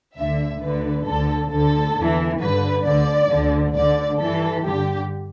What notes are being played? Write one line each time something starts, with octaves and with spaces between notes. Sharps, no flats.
D2 D3 E5
D2 D3 B4
D2 D3 A4
D2 D3 A4
E2 E3
G2 D3 B4
D2 D3 D5
D2 D3
D2 D3 D5
G2 E3 A4
G2 D3 G4